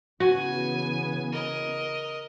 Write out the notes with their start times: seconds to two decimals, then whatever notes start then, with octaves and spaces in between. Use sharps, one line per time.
0.20 C#3 E3 B3 F#4 G#5
1.32 A#4 D#5